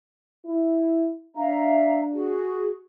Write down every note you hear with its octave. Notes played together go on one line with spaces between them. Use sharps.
E4
D4 E5 F5 A#5
F#4 G#4